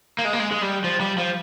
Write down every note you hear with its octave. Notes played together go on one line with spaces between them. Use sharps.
A#3
G#3
A#3
G#3
G#3
G3
F3
G3
F3